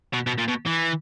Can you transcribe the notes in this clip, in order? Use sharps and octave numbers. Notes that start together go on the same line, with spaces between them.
B2
B2
A#2
B2
E3